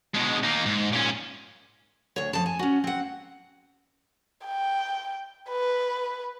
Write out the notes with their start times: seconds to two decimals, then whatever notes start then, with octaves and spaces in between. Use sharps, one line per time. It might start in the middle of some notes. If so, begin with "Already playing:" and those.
0.15 B2 G#3
0.43 A#3 D#4
0.66 G#2
0.92 A#2 C#4
2.16 D2 C#5
2.33 F2 A5
2.46 G#5
2.59 C#4 F#4
2.84 C4 F#5
4.46 G5
5.50 B4